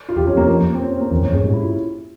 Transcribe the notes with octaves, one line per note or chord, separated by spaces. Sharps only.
F4
E2 G4
F2 C#4
F2 A#3
C4
C#4
A#3
E2 C4
F2 C#4
G2 G#4
G#2 G4
E4
F4